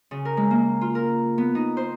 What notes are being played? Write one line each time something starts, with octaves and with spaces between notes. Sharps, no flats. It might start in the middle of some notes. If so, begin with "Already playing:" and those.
C#3
A#4
G#3
A#3
F4
A#4
B3
D#4
C5